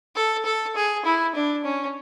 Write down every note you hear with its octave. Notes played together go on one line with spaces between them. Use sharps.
A4
A4
G#4
E4
D4
C#4